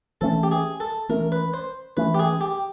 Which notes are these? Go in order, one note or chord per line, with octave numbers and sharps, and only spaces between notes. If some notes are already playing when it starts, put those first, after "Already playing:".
E3 A3 C#4 A4
G4
G#4
A4
E3 A3 C#4 A#4
B4
C5
E3 A3 C#4 B4
G4
G#4
G4